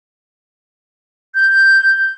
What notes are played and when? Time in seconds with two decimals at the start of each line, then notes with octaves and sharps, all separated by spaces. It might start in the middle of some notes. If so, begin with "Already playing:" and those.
1.35 G6